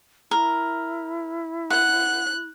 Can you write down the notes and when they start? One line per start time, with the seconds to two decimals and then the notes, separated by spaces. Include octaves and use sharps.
0.31 E4 A#4
1.70 F#5 F#6